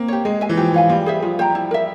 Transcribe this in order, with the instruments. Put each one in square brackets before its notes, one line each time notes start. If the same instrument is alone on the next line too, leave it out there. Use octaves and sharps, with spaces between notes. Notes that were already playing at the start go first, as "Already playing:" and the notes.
Already playing: [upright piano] A#3 C4
[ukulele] G4 C#5
[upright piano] G#3 [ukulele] G#4
[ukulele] E5 G#5
[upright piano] E3
[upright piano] F3 [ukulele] G4
[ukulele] C#5 F5 G#5
[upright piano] G3 [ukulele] F4
[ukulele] G#4 C5 E5
[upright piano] F3 [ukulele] F4
[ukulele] C5 G5 A#5
E4
A#4 E5